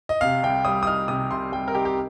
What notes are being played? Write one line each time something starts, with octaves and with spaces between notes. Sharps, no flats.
D#5
C3 F5
C2 G5
G3 D#6
D#6
D#4 F6
C3 D#6
C2 C6
G3 G5
A#4
D#4 G4
G4